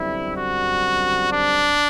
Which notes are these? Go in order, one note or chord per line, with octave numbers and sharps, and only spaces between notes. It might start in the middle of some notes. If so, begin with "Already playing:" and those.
Already playing: F#2 D3 G3 C4 E4
F#4
D4